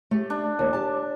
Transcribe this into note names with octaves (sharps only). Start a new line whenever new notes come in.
A3 G4
D4
D#2
G4 A5